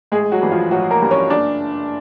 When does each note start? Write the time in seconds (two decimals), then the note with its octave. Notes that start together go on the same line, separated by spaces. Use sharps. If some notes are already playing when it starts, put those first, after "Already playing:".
0.12 A1 G#3 G#4
0.32 F#3 F#4
0.41 G2 E3 G3
0.52 F3 F4
0.71 A1 F#3 F#4
0.91 A#3 A#4
1.01 G2 E3 G3
1.11 C#4 C#5
1.30 F#1 D4 D5